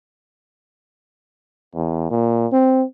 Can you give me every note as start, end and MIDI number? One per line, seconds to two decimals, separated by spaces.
1.75 2.07 40
2.11 2.47 46
2.52 2.84 60